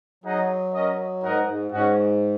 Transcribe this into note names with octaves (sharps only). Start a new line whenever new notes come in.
F#3 D#4 G#4 D#5 F#5
C#4 A#4 D#5
G#2 D#4 A#4 D#5 F#5
G#2
G#2 C#4 F#4 D#5 F#5